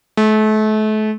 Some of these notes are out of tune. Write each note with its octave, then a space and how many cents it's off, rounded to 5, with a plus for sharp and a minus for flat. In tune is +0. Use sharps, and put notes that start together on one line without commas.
A3 -35